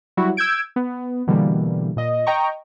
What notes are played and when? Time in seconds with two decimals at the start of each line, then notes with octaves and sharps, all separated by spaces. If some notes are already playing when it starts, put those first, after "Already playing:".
0.17 F#3 G3 E4 F#4
0.37 E6 G6 G#6 D7
0.76 B3
1.27 B2 D3 E3 G3 A#3
1.96 A#2 D#5
2.26 D#5 G5 A#5 C#6